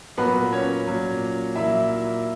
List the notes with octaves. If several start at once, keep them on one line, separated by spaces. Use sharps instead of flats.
A#2 F#3 A#3 B3 B4
C#4 C#5
A#2 F#3 A#3
A#2 F#3 A#3 E4 E5